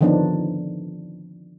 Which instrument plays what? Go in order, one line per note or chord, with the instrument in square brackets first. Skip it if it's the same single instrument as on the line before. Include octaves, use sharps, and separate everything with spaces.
[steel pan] D3 D#3 F3 B3 D4 D#4